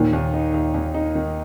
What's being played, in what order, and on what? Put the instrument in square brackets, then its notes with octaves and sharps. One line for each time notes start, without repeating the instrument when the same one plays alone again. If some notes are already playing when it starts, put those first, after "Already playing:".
Already playing: [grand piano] D#2 [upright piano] A#2 D#3
[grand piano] D#2
D#4
D#2
D#2
D#4
D#3